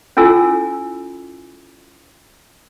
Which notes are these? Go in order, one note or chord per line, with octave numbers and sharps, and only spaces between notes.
C#4 E4 F4 A4 G#5 E6